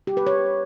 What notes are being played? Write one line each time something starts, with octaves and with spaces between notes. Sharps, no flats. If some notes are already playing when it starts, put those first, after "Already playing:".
G4
B4
C#5